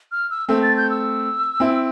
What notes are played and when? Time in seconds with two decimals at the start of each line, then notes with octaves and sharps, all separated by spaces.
0.12 F6
0.30 E6
0.49 A3 C4 E6
0.62 A6
0.77 G6
0.90 E6
1.60 C4 E4